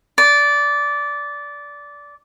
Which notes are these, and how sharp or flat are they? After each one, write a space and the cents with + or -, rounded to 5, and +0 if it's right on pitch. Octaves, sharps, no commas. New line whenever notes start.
D5 -15